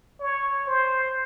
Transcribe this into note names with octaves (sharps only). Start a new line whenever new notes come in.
C#5
C5